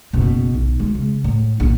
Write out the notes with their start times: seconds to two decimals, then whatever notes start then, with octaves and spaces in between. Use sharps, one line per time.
0.13 F#1 B2
0.54 B1
0.79 G#3
0.95 C#3
1.24 A2
1.60 A#1 E2